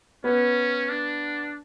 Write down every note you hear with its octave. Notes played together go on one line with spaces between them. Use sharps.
B3 C#4
D4